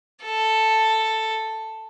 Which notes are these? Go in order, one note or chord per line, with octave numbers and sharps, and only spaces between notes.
A4